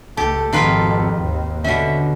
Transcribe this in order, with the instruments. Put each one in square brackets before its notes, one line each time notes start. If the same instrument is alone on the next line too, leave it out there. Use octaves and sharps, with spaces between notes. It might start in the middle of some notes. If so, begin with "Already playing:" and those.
[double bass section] C#2 A3 [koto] G4 [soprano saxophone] A4
[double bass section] G#1 F2 B2 [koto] D#3 F4 B4
[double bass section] D#2
[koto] B2 C#4 [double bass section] D3 [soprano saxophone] E5